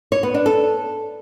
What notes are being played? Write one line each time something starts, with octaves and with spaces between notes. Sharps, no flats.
C#5
B3
D4
A4